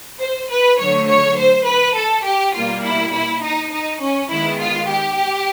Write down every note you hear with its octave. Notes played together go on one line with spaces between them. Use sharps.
C5
B4
D3 F#3 A3 C#5
C#5
C5
B4
A4
G4
B2 G3 A#3 F4
E4
E4
D#4
D#4
C#4
D#3 G#3 B3 E4
F4
G4